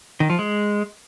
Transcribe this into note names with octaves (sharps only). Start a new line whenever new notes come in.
D#3
F3
G#3